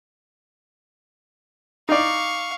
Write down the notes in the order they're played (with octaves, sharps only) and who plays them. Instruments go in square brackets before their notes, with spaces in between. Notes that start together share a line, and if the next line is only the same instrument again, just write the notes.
[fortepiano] D#4 D5 [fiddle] F5 C#6